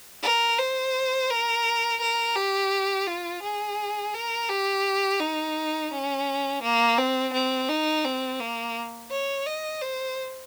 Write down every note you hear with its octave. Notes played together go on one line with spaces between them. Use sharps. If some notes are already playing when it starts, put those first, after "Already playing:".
A#4
C5
A#4
A#4
G4
F4
G#4
A#4
G4
D#4
C#4
A#3
C4
C4
D#4
C4
A#3
C#5
D#5
C5